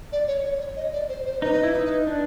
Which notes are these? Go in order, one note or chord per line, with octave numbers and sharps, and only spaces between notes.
D5
C#5
C#5
C#5
D#5
D5
C5
C5
D#4 B4
E4
D#4
D4